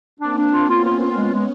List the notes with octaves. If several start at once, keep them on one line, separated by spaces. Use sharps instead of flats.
A#3 C4 D4
D4
F4
B3 C#4 F4
F4
F4
G#3 B3 C#4
G#3